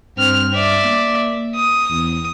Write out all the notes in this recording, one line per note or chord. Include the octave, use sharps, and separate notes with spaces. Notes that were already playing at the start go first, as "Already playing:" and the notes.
G2 C4 F6
D5 E5
A#3
D#6
E2